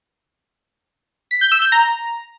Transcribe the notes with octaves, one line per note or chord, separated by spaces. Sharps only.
B6
G6
E6
G6
A#5